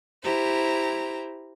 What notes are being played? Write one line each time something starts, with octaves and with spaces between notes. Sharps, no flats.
E4 G4 C5 A#5